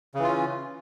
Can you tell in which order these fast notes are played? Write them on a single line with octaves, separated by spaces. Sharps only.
C#3 E3 F4 C#4